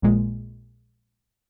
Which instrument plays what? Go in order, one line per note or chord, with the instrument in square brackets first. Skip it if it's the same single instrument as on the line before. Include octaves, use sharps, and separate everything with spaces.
[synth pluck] A#1 A#2 G#3